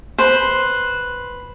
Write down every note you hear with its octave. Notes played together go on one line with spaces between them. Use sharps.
B4 C5